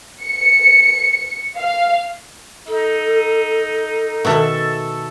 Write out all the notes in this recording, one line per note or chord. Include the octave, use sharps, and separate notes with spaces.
C#7
F5
D#4 A4
B2 D#3 A4 E5 C#6